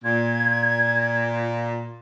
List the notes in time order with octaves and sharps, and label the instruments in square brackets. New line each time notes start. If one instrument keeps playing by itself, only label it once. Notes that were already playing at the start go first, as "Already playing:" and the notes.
[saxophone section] A#2 [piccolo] G#6